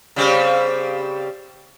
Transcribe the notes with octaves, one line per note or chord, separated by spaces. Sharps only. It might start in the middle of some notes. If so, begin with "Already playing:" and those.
C#3 G3 C4